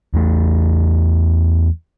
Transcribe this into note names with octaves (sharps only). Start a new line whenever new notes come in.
E2 A3